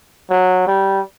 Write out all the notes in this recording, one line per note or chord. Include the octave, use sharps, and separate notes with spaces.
F#3
G3